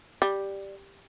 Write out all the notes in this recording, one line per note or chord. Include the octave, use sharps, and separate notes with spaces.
G3